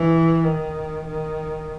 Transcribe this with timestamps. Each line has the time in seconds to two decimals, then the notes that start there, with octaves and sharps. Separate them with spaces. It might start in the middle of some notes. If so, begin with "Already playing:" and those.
Already playing: E3
0.44 D#3
1.07 D#3